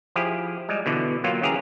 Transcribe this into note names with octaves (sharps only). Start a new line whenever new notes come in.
F3 E4 G4 G#4
G3 G#3
B2 D3 E3
F#3 A#3 F4 G4
C#3 E3 G4 G#4 F5 A#5